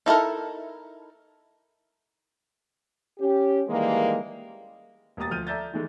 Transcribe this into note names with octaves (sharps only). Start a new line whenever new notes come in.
D#4 E4 A4 A#4
C#4 G4
D#3 E3 G3 G#3 A#3
E1 A#3 G4 A#5 D#6 A6
D2 F3 F6 G6 D#7
A4 D5 E5 A#5 G6 A6
D#3 E3 G#3 A3